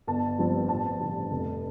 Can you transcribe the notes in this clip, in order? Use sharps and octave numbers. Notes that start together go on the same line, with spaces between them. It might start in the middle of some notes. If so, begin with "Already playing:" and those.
G1 A5
G2 F3 C4
A1 A5
G2 D3
F1